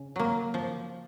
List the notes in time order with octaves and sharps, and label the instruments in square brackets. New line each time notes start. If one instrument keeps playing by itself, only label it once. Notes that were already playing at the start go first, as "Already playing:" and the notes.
Already playing: [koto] C#3
F#3 A#3
F3